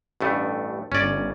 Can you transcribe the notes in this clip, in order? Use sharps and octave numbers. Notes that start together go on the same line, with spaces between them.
A1 G2 A3
G1 C#4 D5